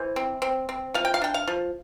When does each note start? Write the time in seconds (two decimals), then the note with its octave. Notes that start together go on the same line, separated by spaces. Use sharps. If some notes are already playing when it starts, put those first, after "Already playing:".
Already playing: E3 C5
0.16 C4
0.42 C4
0.69 C4
0.94 F3 F5
1.05 G5
1.14 F5
1.22 D4 G5
1.34 F5
1.47 F3